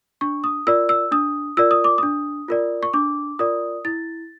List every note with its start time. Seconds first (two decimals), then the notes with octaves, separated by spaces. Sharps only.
0.21 D4 C#6
0.44 D#6
0.67 F4 A#4 D5 E6
0.89 E6
1.12 D4 D#6
1.57 F4 A#4 D5 E6
1.71 D#6
1.84 D6
1.98 D4 D#6
2.48 F4 A#4 D5
2.83 C#6
2.93 D4 D6
3.39 F4 A#4 D5 D#6
3.85 E4 A6